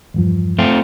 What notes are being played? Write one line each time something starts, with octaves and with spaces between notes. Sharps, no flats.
E2 G2 F3
A3 C4 F4